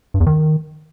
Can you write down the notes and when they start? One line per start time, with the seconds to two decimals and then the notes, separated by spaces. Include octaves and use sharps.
0.14 G2
0.20 E2
0.27 D#3